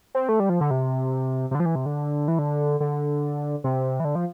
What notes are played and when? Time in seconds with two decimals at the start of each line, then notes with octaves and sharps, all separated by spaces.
0.15 C4
0.29 A3
0.40 G3
0.49 F3
0.61 D3
0.71 C3
1.51 C3
1.55 D3
1.60 F3
1.66 E3
1.75 C3
1.86 D3
2.28 E3
2.39 D3
2.80 D3
3.64 C3
4.00 E3
4.05 D3
4.15 F3